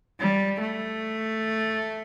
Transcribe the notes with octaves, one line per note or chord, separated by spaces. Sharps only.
G3
A3